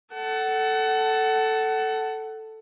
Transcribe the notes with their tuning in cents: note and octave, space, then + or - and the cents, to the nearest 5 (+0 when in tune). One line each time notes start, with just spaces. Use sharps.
A4 +0 F#5 +25